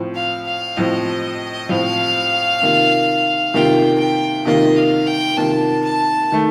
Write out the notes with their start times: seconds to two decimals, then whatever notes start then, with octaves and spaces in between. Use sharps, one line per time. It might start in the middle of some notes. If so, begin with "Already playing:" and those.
Already playing: A2 F3 C4
0.15 F5
0.47 F5
0.77 A2 F3 C4 D#5
1.69 A2 F3 C4 F5
2.62 C3 D#3 A#3 F4
3.54 C3 D#3 A#3 F4 G5
3.99 G5
4.45 C3 D#3 A#3 F4 D#5
4.76 F5
5.07 G5
5.37 C3 D#3 A#3 F4 A5
5.84 A5
6.32 D#3 A3